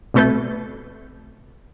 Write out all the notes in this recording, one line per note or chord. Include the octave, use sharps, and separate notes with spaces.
C2 B2 A3 A4 B4 G6